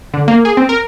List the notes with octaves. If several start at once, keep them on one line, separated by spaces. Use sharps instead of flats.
D3
A#3
G#4
C4
A#4